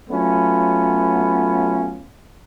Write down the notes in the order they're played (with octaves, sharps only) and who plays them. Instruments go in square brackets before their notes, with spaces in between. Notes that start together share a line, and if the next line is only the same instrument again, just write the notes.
[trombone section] F#3 A3 B3 C#4 F4